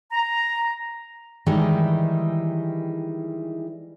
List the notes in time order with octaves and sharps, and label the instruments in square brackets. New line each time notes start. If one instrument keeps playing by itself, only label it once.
[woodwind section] A#5
[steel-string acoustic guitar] D#3 E3 G3 G#3 D#4 E4